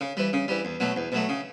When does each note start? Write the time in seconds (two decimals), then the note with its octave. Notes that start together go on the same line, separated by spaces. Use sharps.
0.01 C#3
0.17 E3 G3
0.33 C#3
0.48 E3 G3
0.65 E2
0.80 B2 F#3 A3
0.96 E2
1.12 B2 F#3 A3
1.29 C#3